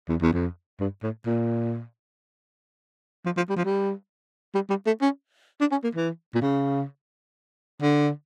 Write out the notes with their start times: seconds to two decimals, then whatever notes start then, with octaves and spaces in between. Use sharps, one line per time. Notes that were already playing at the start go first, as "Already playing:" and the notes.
0.09 E2
0.21 E2
0.33 F2
0.80 G2
1.03 A2
1.26 A#2
3.26 F3
3.37 F3
3.50 G3
3.56 F3
3.65 G3
4.55 G3
4.70 G3
4.86 A3
5.02 C#4
5.60 D4
5.72 C#4
5.84 A#3
5.95 E3
6.34 A#2
6.42 C#3
7.82 D3